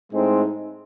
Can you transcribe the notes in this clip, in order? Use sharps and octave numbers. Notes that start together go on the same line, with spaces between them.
A2 G#3 C4 D#4